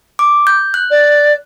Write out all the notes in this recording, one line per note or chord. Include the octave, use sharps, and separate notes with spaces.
D6
G6
F#6
D5